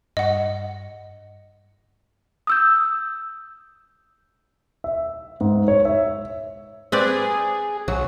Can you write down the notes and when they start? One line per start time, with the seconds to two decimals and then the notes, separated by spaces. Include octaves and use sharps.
0.17 G2 D#5 F#5
2.47 D#6 E6 G6
4.84 E5
5.41 G#2
5.68 C#5
5.85 E5
6.92 C4 G#4 B4 D5
7.88 B1 F#3